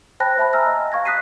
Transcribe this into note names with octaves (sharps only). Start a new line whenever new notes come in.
C5 G5 A5 B5 F#6 A#6
C5 E5 A5 B5
G#5 A#5 E6 F6 A#6
D#5
F5 C#6 G#6 A#6
D#6 F#6 B6 C7 D#7